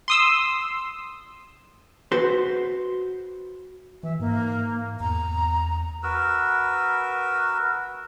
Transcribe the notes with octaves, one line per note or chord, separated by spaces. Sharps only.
C6 D#6 E6
F#4 B4 C5
E3 E5
G#2 A#3
E2 A#5
F#4 A#4 B4 E6